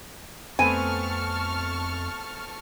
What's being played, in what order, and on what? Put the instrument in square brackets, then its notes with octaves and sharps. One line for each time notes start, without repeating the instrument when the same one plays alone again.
[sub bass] F2 [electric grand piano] A3 B3 C4 [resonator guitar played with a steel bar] G#5 [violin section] A5 C#6 F6